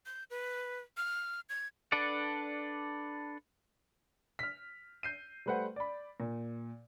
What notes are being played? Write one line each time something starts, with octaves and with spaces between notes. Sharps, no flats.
G6
B4
F6
G#6
D4 A4 B4 D5 F#5
F6 B6
G6 C7 D#7
G3 A3 B4 C5 F#5
D5 B5
A#2